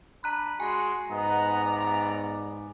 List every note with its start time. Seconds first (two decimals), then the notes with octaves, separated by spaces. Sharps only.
0.24 D4 A#5 B5 F#6
0.60 G#3 F#4 G#5 C6
1.11 G#2 B3 D#5 F#5 A#5
1.63 B3 D5